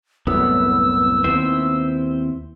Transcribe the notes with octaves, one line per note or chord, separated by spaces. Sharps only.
C2 F#2 A2 B3 E6
D#2 B3 C4 E4 C5